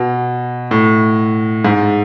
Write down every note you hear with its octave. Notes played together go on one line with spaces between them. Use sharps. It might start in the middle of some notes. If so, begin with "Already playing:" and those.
Already playing: B2
A2
G#2